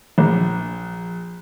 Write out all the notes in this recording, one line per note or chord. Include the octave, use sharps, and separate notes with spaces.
A#1